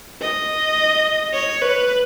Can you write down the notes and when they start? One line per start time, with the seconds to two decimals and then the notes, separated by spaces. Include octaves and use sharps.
0.21 D#5
1.33 C#5
1.62 B4